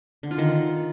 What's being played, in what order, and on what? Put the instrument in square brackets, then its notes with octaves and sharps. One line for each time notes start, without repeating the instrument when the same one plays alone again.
[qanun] D3
F4
D#3